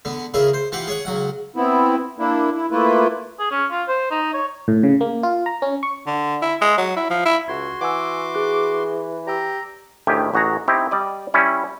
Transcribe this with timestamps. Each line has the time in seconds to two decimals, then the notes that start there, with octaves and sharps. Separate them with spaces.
0.05 D3 B3
0.34 C#3 E4 G#4 A#4
0.54 C5
0.72 E3 F4 G4 F#5 B5
0.87 G#4 C#5 F#5
1.05 C#2 F#3 F#5
1.56 B3 C4 E4
2.19 A#3 D4 E4
2.54 E4
2.71 A3 A#3 E4 F4 B4
3.39 G#4
3.51 C#4
3.71 F4
3.88 C5
4.11 D#4
4.34 C#5
4.68 A2
4.83 C#3
5.01 A#3
5.23 F4
5.46 A#5
5.62 C#4
5.83 C#6
6.06 D3
6.42 E4
6.61 G#3
6.78 F#3
6.97 E4
7.10 F3
7.26 E4
7.48 C#2 F#4 C6 G#6
7.81 E3 F#5 G#5 D6 E6
8.35 G#4 F#6
9.27 G4 D5 A#5 E6
10.07 D2 A2 D#3 G4 G#5
10.34 A1 F#4 G#4 A#5
10.68 C4 D#4 E4 G4
10.91 G3 D5 D#5
11.34 G3 C#4 E4